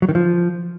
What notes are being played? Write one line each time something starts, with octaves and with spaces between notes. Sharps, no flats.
F#3
D#3
F3